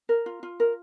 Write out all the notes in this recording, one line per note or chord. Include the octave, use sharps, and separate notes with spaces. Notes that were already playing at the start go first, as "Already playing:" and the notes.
A#4
F4
F4
A#4